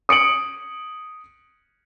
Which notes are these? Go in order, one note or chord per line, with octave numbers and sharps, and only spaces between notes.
D#6 C#7 D7 F#7